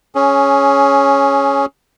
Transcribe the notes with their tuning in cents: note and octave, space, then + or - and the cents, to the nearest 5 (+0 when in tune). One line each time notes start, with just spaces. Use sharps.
C#4 +0 G#4 +15